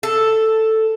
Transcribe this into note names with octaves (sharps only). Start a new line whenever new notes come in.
A4